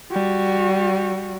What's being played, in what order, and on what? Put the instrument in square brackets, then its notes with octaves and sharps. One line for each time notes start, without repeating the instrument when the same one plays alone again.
[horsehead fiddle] G3 F#4